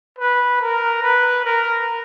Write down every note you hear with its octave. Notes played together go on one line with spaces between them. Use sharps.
B4
A#4
B4
A#4